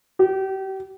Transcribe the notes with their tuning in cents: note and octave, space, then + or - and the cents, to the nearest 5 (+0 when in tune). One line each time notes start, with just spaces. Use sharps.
G4 -35